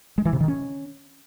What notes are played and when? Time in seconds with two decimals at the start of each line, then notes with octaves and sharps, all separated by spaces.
0.18 G#3
0.25 E3
0.33 C3
0.40 D#3
0.48 C#4